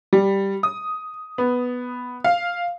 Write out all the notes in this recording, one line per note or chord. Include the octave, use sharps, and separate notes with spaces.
G3
D#6
B3
F5